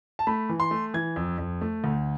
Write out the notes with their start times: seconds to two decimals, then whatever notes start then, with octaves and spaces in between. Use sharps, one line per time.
0.19 A5
0.27 A3 B5
0.49 E3
0.60 C6
0.71 A3
0.94 E3 G#6
1.16 F2
1.38 F2
1.61 A3
1.84 D2